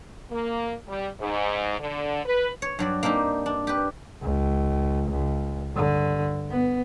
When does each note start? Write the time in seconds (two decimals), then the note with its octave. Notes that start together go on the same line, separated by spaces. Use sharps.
0.31 A#3
0.88 G3
1.20 G#2
1.80 D3
2.26 B4
2.62 C#5
2.79 G2 F#3 D5
3.03 A#3 C4 D4 D#4 G4
3.46 D4
3.67 G4 B4
4.22 C#2
5.10 C#2
5.73 G2 D3
6.51 B3